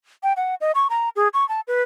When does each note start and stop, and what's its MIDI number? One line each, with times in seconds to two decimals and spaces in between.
0.23 0.33 79
0.36 0.55 78
0.61 0.71 75
0.75 0.87 85
0.90 1.09 82
1.16 1.28 68
1.34 1.47 85
1.49 1.60 81
1.67 1.82 71